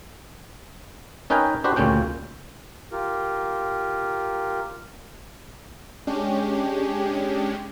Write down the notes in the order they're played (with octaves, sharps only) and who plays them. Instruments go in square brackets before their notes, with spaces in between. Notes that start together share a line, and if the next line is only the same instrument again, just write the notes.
[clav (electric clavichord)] C#4 D#4 A#4 B4 G5 G#5
D4 F#4 G4 B4 C5
D2 A#2 C#3 C#4 G5
[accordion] F4 G4 A#4
[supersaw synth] G#3 C#4 D4 G4